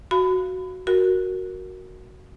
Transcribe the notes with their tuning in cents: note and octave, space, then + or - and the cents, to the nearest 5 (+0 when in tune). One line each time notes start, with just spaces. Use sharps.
F#4 +0 F5 -10 B5 +30
F#4 +0 A#4 +0